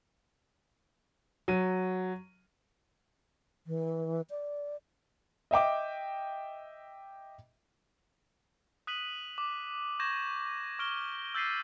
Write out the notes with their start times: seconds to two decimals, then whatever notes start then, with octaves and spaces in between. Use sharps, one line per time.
1.48 F#3 D#7
3.67 E3
4.30 D5
5.51 D#5 E5 G5 D6
8.87 D#6 F#6 B6 D#7 F#7
9.38 D6
10.00 C#6 D#6 G6 G#6 A#6 E7
10.79 C#6 F6 D7 E7 G7
11.34 E6 G6 A6 B6 C7 D#7